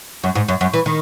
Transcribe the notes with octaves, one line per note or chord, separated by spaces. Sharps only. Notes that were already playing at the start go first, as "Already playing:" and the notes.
F#2
G#2
F#2
F#2
E3
D#3